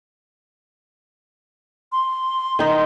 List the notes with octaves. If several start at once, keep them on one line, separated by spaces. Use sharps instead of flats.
C6
D#3 D#4